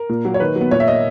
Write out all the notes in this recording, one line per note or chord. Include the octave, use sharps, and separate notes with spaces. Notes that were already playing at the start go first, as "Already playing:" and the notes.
Already playing: A#4
A#2
F#3 A#3
C#5
D#3 B4
F#3
B3
A#2 C#5
E5
A#3 D#5